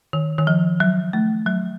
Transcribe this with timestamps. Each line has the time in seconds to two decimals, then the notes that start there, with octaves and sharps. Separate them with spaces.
0.13 D#3
0.39 D#3
0.47 F3
0.80 F#3
1.13 A3
1.47 F#3